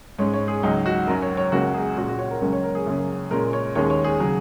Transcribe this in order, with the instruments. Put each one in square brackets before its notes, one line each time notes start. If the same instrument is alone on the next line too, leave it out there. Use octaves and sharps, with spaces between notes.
[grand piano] G#2 G#3 C#4 C#5
C#5
G#4
C#2 C#3 F#3 D#4
F#4
F#2 F#3 C#4 A#4
C#5
C#5
C#2 C#3 A#3 C#4 F#4
G#4
A#2 G#3 C#4 F#4
F#4
C#5
A#4
C#2 C#3 F#3 A#3 C#4
C#5
A#4
G#4
F#2 C#3 A#3 C#4
A#2 G#3 C#4 A#4
C#5
D#2 D#3 G#3 C#4 C#5
C#5
G#4
C#3 F#3